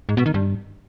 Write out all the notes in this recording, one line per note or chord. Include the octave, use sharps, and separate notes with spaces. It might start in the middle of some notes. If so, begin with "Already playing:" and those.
G#2
B2
D#3
G2